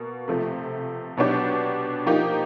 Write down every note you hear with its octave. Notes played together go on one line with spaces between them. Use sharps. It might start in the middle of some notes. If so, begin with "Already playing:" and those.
Already playing: B2 A#3
C3 F3 A3
B2 F#3 B3 D4 G4
F3 A#3 D#4 G4